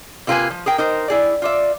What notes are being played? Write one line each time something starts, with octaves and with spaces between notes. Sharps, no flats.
C3 A#3 F4 G#4 B4 G#5
F3
G#4 A#4 G5
D#4 A#4 C5
E4 G#4 D5
F4 D5 E5